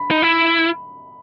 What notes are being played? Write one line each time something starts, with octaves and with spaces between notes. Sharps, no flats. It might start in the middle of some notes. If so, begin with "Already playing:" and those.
Already playing: B5
D#4
E4